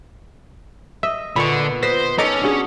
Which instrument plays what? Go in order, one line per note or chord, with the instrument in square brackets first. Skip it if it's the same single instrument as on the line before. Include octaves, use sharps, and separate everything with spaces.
[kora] D#5 [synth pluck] E5
[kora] A#2 B3 [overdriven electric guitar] D3 [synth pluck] B5 C#6
[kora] B4 D#5 [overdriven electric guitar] C5 [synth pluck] A#6 B6 E7
[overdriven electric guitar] C#4 [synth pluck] D#4 A#5 D6 [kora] A4
[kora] D4 F#4 G#4